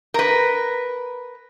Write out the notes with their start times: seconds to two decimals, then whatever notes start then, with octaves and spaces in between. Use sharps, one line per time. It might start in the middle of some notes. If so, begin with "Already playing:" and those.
0.14 A#4 B4